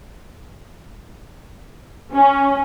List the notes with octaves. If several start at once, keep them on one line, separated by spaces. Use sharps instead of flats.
C#4